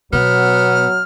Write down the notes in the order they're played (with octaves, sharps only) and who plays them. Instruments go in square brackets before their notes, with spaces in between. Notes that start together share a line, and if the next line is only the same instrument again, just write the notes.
[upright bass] B2 [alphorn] F#3 [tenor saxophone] B3 [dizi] F6